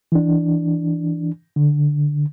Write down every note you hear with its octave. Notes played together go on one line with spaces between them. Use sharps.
E3 D4
D3